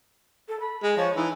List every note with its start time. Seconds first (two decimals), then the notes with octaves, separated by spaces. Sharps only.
0.49 A4
0.60 B5
0.83 G#3
0.97 F3 C#5
1.16 E3 D#4